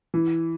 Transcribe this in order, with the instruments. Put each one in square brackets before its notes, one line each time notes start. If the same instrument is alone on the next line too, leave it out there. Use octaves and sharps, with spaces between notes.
[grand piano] E3